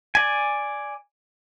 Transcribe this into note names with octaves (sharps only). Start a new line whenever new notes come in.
D5 G#5